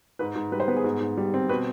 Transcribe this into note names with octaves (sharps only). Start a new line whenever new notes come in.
G#2 B4
G#2
G3 B4
C5
B3 B4
G#4
G#2
G#2
G3
C4
B2 B4